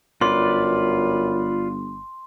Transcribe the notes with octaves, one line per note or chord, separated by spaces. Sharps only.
G1 F#2 F4 B4 D5 C6